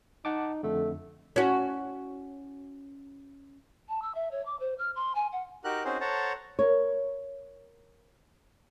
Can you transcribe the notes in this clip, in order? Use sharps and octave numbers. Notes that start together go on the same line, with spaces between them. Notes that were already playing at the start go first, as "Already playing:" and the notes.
D#4 F#5 A5 D6
F2 D3 A3
C#4 F#4
A5
E6
E5
C#5
D6
C5
F6
C6
G#5
F#5
D#4 F#4 G4 A#4 F#6
C4 C#4 D#4 F#4 G#4 C5
A4 C5 C#5 F#5 A5 A#5
A#4 C#5